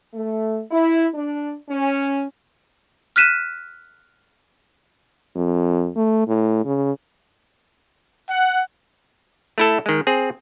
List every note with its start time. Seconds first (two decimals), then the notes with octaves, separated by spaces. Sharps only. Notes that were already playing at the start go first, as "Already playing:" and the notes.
0.14 A3
0.71 E4
1.14 D4
1.69 C#4
3.16 F6 F#6 B6 D#7 E7
5.36 F2
5.96 A3
6.27 A2
6.65 C#3
8.29 F#5
9.58 A3 E4 A4
9.86 D#3 G#3
10.07 C4 G#4